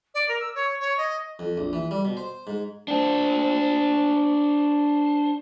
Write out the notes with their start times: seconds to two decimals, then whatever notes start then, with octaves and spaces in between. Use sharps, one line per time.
0.14 D5
0.28 A#4
0.40 E6
0.55 C#5
0.80 C#5
0.97 D#5
1.39 F2
1.58 A#1
1.73 E3
1.91 G3
2.05 B2
2.17 C5
2.47 G#2
2.88 D4 C5